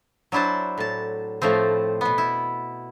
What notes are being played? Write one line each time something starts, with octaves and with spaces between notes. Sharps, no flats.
F#3 D4 E4 C5 A5
A2 A5
A2 F3 A3 C4
B2 B3
E4